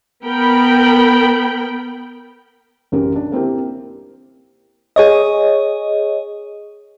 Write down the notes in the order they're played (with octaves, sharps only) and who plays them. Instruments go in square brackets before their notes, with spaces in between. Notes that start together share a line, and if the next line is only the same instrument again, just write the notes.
[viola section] B3 A#4 G5 B5
[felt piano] A1 F#2 C#3 G4 A#4
D4
A#3 C4 E4 G4
[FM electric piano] G#4 C#5 D#5